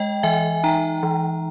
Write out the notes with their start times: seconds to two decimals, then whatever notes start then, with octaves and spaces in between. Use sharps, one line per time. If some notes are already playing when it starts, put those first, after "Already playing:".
Already playing: G#3 D#5 G5
0.23 E3 E5 G#5
0.64 D#4 G5 A#5
1.03 E3